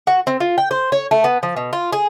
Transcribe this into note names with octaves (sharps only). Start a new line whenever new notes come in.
F#4
C4
F4
G5
C5
C#5
A3
B3
F3
B2
F4
G#4